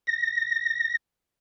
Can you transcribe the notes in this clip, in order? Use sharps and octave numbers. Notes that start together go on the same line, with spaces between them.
A#6